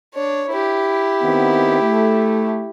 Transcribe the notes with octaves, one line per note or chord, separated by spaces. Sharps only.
D4 C#5
E4 G4
D#3 B3 C4
A3